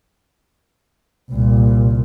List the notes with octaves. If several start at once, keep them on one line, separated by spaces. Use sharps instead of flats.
C2 A#2